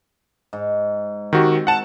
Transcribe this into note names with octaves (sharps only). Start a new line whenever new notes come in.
G#2
D#3 C4 F#4 G4
F#5 A5 E7